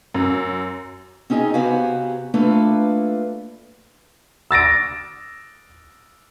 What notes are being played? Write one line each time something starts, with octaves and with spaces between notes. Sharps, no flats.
F#2
C4 C#4 D#4 G#4 D#5
C3 B3 F#4 G4 F5 G#5
A3 A#3 D4 F4 A4 B4
E6 A6 A#6 D7